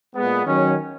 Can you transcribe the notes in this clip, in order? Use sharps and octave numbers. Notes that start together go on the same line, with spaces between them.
A#2 G#3 B3
D#3 F#3 C#4